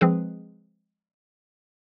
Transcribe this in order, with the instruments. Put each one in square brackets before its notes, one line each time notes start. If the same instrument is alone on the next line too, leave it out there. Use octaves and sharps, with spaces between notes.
[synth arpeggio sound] F3 G#3 C4 G#4 B4